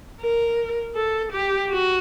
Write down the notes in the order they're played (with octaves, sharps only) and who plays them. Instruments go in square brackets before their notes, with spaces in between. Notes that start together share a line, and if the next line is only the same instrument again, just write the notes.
[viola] A#4
A4
G4
F#4